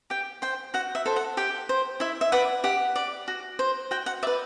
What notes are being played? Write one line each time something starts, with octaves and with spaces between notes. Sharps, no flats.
G4 G5
C5 G5
F#4 F#5
E5
A4 C5
F#5
G4 G5
C5
E4 E5
E5
B4 D5 F#5
G4 F#5
D5
F#4
C5
F#4 G5
F#5
B4 D5 E5